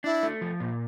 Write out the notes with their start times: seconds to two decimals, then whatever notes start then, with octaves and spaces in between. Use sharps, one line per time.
0.04 D4 E4
0.23 A3
0.41 F3
0.60 A#2